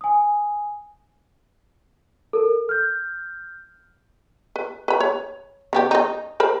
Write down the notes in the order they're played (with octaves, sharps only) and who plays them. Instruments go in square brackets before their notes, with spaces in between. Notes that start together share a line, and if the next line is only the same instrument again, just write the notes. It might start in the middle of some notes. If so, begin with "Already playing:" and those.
[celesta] G#5 D#6
A4 A#4
F6 G6
[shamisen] B4
B4 B5
C#5
C#3 B3 G4
D#4 D#5
A#4 C5 B5